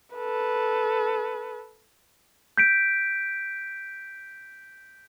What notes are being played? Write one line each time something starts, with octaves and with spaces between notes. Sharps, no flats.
A4 B4
G6 B6 D7